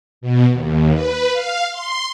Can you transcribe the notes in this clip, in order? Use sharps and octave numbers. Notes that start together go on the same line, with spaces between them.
B2
D#2
B4
F5
C6